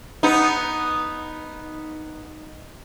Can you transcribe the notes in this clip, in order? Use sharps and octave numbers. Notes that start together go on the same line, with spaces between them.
B3 D#4